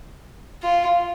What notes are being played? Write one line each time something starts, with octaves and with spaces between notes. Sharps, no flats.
F4